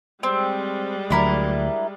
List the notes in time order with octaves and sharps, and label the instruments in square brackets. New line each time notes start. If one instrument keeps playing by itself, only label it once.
[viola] G3 G#3 [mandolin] C4
[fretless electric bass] D2 F#3 [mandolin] D4 E4 A#4